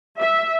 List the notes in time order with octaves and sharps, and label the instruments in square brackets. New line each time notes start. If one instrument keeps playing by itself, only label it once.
[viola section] E5